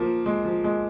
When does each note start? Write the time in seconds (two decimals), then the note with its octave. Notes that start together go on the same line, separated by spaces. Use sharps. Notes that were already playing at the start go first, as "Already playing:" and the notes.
Already playing: F3 A#3
0.26 G#3
0.45 F3
0.64 G#3